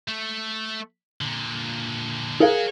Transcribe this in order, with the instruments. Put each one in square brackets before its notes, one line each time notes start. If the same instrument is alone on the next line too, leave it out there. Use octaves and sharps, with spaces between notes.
[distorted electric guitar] A3
A#2 D3
[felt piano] G#4 A#4 F5 [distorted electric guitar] C#5 F#5